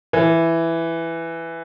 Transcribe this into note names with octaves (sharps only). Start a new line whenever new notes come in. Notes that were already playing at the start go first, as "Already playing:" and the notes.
E3